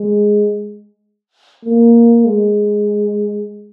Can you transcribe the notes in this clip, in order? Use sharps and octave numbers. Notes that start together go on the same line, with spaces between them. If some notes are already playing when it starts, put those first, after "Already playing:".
Already playing: G#3
A#3
G#3